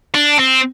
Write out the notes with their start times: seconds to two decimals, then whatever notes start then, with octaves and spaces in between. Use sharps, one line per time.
0.14 D4
0.39 C4